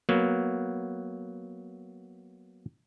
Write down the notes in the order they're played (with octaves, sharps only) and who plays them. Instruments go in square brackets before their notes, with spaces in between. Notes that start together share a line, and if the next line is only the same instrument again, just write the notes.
[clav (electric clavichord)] F#3 A#3 B3